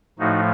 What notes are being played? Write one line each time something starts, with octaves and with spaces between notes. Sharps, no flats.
A2 F3 A3 D#4 F#4